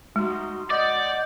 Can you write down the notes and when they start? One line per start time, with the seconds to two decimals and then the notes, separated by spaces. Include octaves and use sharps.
0.16 G#3 D#4 F#4 C6
0.70 D5 D#5 F#5 D6 G6